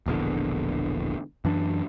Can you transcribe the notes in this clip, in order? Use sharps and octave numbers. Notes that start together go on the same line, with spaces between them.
E1 A#1 E2 D3
F#2 E3 D4